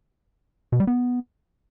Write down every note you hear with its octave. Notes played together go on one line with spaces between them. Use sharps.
B2
G3
B3